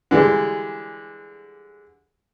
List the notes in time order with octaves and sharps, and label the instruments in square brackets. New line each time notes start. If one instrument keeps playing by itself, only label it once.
[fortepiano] D3 E3 G3 G#3